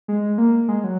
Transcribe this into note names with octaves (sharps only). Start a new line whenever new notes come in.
G#3
A#3
G#3
F#3